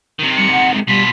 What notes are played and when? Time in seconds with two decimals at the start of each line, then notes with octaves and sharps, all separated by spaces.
0.19 C3 D#3
0.37 G3 C#7
0.52 F#5
0.74 G#3
0.88 B2 G3 F4 B6